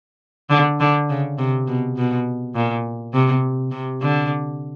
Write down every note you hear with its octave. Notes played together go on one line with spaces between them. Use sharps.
D3
D3
C#3
C3
B2
B2
A#2
C3
C3
D3